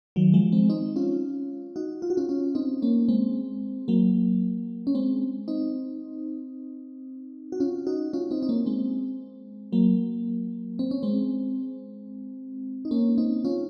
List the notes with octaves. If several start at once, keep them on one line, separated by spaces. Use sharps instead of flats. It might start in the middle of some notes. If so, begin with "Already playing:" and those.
D#3 F#3
F3 G#3
G#3 C4
C4 D#4
C#4 F4
D#4 F#4
F4
F#4
C#4 F4
C#4 F4
C4 D#4
A#3 C#4
G#3 C4
F#3 A#3
C#4
G#3 C4
C4 D#4
F#4
C#4 F4
D#4 F#4
C#4 F4
C4 D#4
D#4
A#3 C#4
G#3 C4
F#3 A#3
C4
C#4
G#3 C4
D#4
A#3 C#4
C4 D#4
C#4 F4